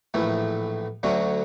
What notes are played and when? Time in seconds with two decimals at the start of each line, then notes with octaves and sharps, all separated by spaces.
0.14 A#1 A2 E3 A3
1.03 D2 D3 F#3 A3 C#4